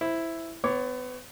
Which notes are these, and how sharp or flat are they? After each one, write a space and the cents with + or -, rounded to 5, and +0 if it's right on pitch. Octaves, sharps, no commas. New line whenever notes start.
E4 +0 C5 +0
B3 +30 C#5 +0 D6 -15